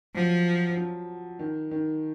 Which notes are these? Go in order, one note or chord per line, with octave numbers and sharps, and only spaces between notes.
F3 F#3
F3
D#3
D#3